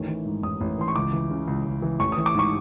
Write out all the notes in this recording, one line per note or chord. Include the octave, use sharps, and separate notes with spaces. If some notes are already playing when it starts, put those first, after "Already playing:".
Already playing: A1 D#3
E3
G#2
A1 D#6
A1
E3 C6
C#6
C#2 D6
E3
C#3
C#2
C#2
E3
A1 C#6
D#6
E3
D6
G#2 C#6